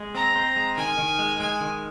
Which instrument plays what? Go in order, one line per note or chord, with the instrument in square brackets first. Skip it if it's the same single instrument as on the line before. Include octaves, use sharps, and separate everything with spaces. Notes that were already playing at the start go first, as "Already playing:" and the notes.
Already playing: [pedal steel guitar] G#3
[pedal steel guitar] C4 [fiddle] A#5
[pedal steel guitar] C4
G#3
[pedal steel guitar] D#3 [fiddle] G#5
[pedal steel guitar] D#3
G#3
[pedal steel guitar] G#3 [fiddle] G#5
[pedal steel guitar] D#3